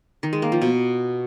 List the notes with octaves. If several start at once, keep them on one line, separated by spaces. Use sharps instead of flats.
D#3
G#3
A#3
F3
B2